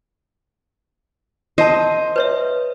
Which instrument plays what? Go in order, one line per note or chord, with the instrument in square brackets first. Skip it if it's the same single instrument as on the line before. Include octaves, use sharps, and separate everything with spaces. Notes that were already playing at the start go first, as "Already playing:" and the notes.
[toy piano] A#4 A5 [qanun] C5 D#5 C6
[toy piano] B4 C#5 E5